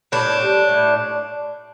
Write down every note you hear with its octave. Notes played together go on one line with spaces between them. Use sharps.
A2 D4
G3
A2